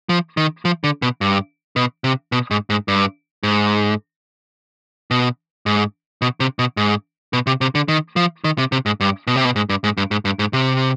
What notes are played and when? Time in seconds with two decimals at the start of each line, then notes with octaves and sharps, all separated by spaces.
0.09 F3
0.37 D#3
0.65 F3
0.84 D3
1.02 B2
1.21 G2
1.76 B2
2.04 C3
2.32 B2
2.51 G#2
2.70 G#2
2.88 G2
3.43 G#2
5.11 B2
5.66 G#2
6.22 B2
6.40 C3
6.59 B2
6.77 G#2
7.33 B2
7.47 C3
7.61 C3
7.75 D3
7.88 D#3
8.16 F3
8.44 D#3
8.58 C3
8.72 C3
8.86 G#2
9.00 G2
9.27 B2
9.36 C3
9.45 B2
9.56 G#2
9.69 G2
9.84 G#2
9.97 G2
10.11 G#2
10.25 G2
10.39 G#2
10.53 C3